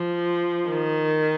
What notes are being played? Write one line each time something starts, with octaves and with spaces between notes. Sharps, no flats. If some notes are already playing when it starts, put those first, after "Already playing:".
Already playing: F3
D#3